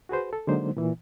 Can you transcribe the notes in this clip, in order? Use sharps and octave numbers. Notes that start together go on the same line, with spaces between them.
F#4 G#4 B4 C5
A4
D3 F#3 G#3 A#3 D#4 C5
A#2 E3